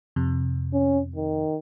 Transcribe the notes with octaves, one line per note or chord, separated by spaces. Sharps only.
F2 C3
C#4
D#3